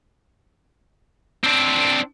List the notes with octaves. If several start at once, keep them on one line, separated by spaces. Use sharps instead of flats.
C4 D4